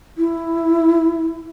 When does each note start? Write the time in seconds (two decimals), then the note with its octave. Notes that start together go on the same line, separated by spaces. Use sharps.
0.18 E4